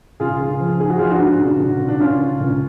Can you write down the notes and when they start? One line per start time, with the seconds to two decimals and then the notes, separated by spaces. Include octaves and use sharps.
0.20 C#2 F4 G#4
0.40 C#2
0.60 F3
0.80 G#2 G#4
0.90 F#4
0.99 F3 F4 G#4
1.10 D4 F#4
1.20 G#2
1.40 C#2
1.60 C#2
1.80 C#2
1.88 D4
2.00 C#2 C#4 F4
2.20 C#2
2.40 C#2